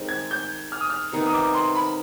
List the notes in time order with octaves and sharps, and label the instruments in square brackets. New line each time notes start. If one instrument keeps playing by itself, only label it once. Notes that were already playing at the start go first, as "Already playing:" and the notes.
Already playing: [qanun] D#3 G#3 C4 G4
[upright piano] G#6
G6
F6
D#6
F6
[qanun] C3 D#3 B3 D#4
[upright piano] D#6
D6
C6
B5